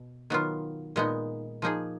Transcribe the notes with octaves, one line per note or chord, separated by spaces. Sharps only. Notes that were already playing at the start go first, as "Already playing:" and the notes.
Already playing: B2
D#3 F#3 B3 F4
A#2 G#3 B3 D#4
F3 A#3 D#4 G#4